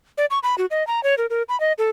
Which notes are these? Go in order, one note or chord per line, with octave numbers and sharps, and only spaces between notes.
D5
C#6
B5
F#4
D#5
A#5
C#5
A#4
A#4
B5
D#5
A4